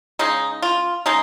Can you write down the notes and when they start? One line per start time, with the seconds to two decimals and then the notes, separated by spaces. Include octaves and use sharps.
0.19 C#3 G#3 D#4
0.62 F4
1.06 C#3 G#3 D#4